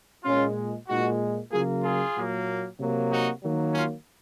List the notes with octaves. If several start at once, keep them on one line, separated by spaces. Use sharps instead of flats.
A#2 G#3 C#4 F4
A#2 G#3 D#4 F#4
C#3 F#3 A#3 F4 G#4
F4 G#4
A#2 F#3 A#3
C3 F#3 A#3
D#4 F#4
D#3 F#3 A#3
C#4 F4